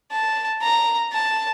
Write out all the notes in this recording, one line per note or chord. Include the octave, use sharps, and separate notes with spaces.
A5
A#5
A5